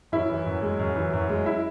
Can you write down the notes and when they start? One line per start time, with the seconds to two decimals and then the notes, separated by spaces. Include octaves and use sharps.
0.12 F#2 E4
0.30 E3
0.46 F#2
0.62 G#3
0.79 F#2
0.96 E3
1.13 F#2
1.30 G#3
1.46 E4